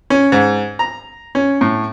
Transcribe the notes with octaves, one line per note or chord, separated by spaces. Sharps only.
C#4
G#2
A#5
C#4
A2